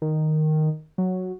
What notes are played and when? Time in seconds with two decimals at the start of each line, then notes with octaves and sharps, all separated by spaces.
0.02 D#3
0.98 F#3